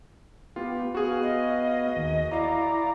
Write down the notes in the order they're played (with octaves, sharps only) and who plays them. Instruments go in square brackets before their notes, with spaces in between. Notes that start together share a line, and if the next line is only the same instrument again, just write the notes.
[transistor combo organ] B3 G4 [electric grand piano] F4
[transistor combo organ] B3 F5 [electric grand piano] F#4 G#4
[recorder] D#5
[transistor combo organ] D#2
[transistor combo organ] E4 D5 A#5 [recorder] F5